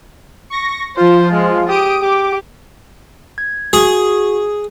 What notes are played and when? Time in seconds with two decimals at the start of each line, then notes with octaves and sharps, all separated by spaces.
0.50 C#6 A#6
0.97 F3 F4 C5
1.33 G#3
1.68 G4 D#6 D7
2.02 G4 D6
3.38 G#6
3.73 F#4 G#4